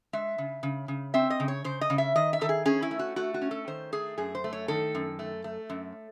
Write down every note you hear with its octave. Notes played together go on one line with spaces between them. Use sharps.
G#3 E5
C#3
C#3
C#3
C4 E5
D#5
C#3
C#5
C#3 C5
D#5
C#3
E5
D#3 D#5
E5
D#3 A4
G#4
C#4 G#4
E4
A3
F#4
A3 F#4
F#4
C#4
A4
D#3 C5
A3 G#4
F#2 G#4
C5
A3
C#5
D#3 A4
F#2
A3
A3
F#2